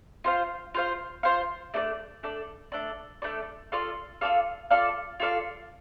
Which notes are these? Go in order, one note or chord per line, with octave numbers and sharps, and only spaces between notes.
F4 C5 F5
F4 C5 F5
F4 C5 F5
A3 D4 A4 D5
A3 D4 A4 D5
A3 D4 A4 D5
A3 D4 A4 D5
F4 A4 D5 F5
F4 A4 D5 F5
F4 A4 D5 F5
F4 A4 D5 F5